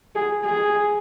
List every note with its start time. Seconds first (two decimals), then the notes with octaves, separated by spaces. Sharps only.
0.15 G#4
0.45 G#4